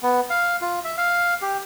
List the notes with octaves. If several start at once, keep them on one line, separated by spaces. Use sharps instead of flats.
B3
F5
F4
E5
F5
G4